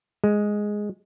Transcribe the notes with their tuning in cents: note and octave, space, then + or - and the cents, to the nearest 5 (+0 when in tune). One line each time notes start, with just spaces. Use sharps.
G#3 +0